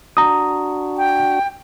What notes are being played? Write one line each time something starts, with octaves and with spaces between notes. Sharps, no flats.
D4 F#4 A#5 D#6
G5